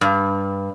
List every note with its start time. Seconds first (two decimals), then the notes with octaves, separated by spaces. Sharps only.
0.01 G2